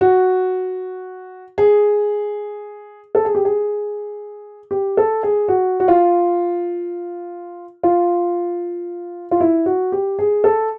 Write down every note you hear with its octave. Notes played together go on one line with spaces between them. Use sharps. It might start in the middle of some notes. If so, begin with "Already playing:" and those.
F#4
G#4
A4
G#4
G4
G#4
G4
A4
G#4
F#4
F#4
F4
F4
F4
E4
F#4
G4
G#4
A4